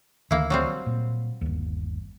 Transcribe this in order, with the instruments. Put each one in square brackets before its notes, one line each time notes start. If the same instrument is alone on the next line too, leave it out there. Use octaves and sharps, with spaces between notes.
[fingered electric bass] D2 D#3 [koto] A#3 E4
[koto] F#3 G3 C4
[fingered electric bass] A#2
G1 D#2